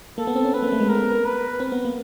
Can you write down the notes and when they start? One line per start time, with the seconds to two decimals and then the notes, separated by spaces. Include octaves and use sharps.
0.18 A#3 A4
0.27 B3
0.35 C4
0.45 C#4
0.54 C4 B4
0.62 A#3
0.72 A3
0.80 G#3
0.89 B3 A#4
1.25 B4
1.60 C4
1.72 B3
1.85 A#3